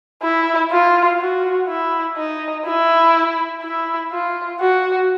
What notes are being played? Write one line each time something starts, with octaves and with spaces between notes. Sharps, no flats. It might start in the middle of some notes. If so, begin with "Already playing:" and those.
E4
F4
F#4
E4
D#4
E4
E4
F4
F#4